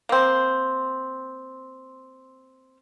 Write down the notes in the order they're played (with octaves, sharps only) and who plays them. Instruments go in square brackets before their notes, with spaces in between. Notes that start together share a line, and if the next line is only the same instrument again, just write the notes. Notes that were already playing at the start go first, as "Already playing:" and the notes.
[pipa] A#3 C4